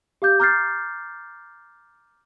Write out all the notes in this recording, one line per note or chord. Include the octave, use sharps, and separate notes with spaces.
G4 F5 D6 G6
A#5 D6 F6 G6 A6 C7